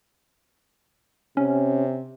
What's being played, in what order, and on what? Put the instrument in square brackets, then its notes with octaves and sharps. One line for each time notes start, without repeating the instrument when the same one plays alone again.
[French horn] C3 [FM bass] C#4